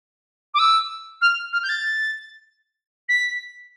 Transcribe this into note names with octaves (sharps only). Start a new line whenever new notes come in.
D6
E6
F6
F6
G6
A6
B6